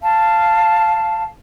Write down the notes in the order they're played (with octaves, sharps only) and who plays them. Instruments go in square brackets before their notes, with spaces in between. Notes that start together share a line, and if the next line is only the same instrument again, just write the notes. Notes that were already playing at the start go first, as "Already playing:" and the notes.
[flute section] F5 A5